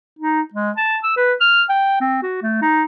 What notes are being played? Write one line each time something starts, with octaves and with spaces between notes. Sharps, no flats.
D#4
G#3
A5
E6
B4
F6
G5
C4
F#4
A3
D#4